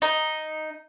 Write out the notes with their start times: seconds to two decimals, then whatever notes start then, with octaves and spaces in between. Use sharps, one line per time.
0.02 D#4